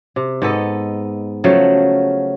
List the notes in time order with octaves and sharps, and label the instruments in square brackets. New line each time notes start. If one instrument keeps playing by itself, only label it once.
[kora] C3
G#2 B3 A4 D#5
C#3 F3 F#3 A3